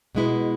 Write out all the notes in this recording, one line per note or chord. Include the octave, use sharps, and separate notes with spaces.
B2 G#3 B3 E4